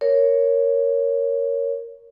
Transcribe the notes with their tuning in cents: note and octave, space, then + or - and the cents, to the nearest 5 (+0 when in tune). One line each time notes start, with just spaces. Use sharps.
A#4 +0 C#5 +0